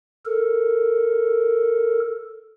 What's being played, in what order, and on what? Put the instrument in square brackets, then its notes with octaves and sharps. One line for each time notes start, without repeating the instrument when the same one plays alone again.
[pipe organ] A4 A#4